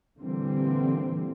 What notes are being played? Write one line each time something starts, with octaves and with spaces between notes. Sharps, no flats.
A#2 D3 E3 G3 A#3 C4